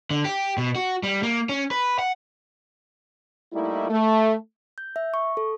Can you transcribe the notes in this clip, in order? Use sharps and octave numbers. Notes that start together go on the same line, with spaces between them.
D3
G4
B2
F#4
G3
A#3
C#4
B4
F#5
G3 A3 A#3 D#4 E4
A3
G6
E5
C#6
A4